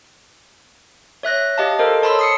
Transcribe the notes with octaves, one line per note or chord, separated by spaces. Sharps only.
C#5 E5 F#6 A#6
G4 D#5 F5 A5
A4 A#4 C5 D#5
C#5 A5 B5 C6 E6
D#6 C7 C#7